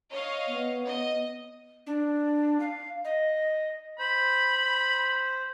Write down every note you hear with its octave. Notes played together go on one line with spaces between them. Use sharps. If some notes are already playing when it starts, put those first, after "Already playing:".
C#5 D#5 F5
B3
D#5
D4
F5
D#5
C5 B5